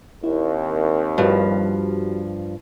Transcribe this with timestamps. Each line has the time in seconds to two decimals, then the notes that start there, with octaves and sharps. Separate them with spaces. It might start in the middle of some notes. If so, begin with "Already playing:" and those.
0.24 D#2 C4 E4
1.18 G2 F3 G3 F#4 G4